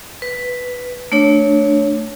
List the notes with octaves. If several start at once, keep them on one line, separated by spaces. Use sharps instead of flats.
B4
A3 D4 C#5